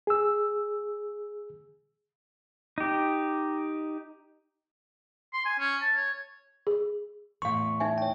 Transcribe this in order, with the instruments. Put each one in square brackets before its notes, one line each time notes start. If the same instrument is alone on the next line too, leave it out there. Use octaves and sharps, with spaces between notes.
[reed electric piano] G#4 E6
[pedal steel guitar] D#4 G4
[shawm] C6
G#5
C#4
A5
C#5
[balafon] G#4
[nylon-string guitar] E2 A2 [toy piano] F5 C6 [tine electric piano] C#6
[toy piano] D#4 E5 G#5
[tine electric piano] C#5 G5